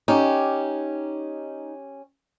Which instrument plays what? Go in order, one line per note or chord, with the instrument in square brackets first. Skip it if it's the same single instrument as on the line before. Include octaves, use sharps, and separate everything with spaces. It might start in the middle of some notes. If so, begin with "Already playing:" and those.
[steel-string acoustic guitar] C#4 G4 [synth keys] D#4